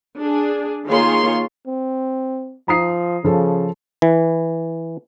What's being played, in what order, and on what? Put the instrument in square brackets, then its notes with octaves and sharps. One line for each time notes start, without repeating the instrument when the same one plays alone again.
[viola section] D4 G#4
D#3 A#3 F4 G#4 C#5 C6
[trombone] C4
[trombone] F3 [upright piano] A#5 D#6 C7
[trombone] C#3 [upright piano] F3 A4
[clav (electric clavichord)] E3